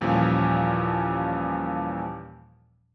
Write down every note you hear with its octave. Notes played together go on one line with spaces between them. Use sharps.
D#2 A#2 E3 F3 G3 C#4